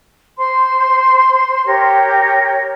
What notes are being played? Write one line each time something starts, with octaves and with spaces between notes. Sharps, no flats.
C5 C6
G4 A#4 C#5